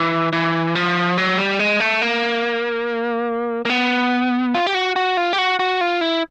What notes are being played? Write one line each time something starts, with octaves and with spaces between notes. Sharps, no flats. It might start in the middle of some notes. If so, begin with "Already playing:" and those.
Already playing: E3
E3
F3
F#3
G3
G#3
A3
A#3
A#3
B3
F4
G4
F#4
F#4
F4
G4
F#4
F#4
F4
E4